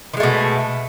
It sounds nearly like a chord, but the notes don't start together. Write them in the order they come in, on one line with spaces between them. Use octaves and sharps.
D#3 G#3 A3 B2